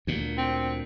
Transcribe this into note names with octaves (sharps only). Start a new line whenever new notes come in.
D2 A#2
C4